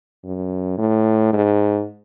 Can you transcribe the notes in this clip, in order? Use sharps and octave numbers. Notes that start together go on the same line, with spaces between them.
F#2
A2
G#2